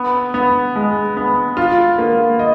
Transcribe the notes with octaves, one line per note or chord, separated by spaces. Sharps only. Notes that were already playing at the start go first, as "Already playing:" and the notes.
Already playing: B3
B3
G#3
B3
F4
A#3
D#5